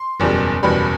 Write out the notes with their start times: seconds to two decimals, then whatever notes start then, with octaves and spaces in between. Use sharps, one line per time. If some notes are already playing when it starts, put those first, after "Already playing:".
Already playing: C6
0.20 F#1 E2 B2 G3
0.63 F#1 E2 B2 G3 B5